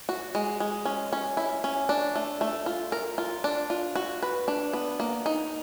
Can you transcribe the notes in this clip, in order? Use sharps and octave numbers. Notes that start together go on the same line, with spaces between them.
F#4
G#3
G#3
C#4
C#4
E4
C#4
D4
A3
A3
F4
A#4
F4
D4
F4
F#4
B4
D4
B3
A#3
D#4